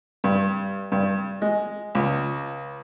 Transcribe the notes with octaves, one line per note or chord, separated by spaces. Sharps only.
G2
G2
G#3
C#2